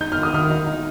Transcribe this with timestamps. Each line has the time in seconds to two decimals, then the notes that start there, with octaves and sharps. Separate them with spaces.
0.01 D#4 G6
0.12 F6
0.18 D#3
0.23 D#6
0.34 D#3 F6
0.50 D#4
0.67 D#4